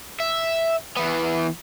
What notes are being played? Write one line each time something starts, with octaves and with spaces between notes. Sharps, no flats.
E5
E3 B3